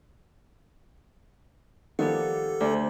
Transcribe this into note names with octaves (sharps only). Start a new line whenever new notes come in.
D#3 F3 G3 G4 A4 D5 F#5
D2 C5 D5